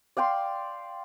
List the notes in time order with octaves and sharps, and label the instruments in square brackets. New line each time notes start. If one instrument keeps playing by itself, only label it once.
[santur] D5 F5 G5 C6